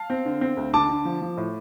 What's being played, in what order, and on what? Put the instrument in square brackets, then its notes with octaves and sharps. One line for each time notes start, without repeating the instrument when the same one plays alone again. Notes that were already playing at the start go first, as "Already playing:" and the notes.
Already playing: [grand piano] F5 A5
[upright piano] C4
D3
C4
D2
[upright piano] D3 [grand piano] A5 D6
[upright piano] D3
F3
F3
A2